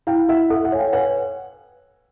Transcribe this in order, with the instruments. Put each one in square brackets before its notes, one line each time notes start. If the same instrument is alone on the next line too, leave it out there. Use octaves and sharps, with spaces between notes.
[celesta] E4 [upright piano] F5 G5
[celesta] E4 [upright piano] E5 F#5
[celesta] A4 [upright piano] E5 F#5
[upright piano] E5 F#5
[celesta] C#5 [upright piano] G#5
[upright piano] F5 G5
[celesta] B4 [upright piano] F#5 G#5